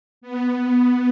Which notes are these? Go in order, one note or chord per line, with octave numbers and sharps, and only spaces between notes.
B3